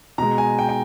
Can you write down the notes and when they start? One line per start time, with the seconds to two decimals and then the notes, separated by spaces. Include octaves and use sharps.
0.18 B2 G#3 A#5
0.38 G#5
0.59 G5
0.69 G5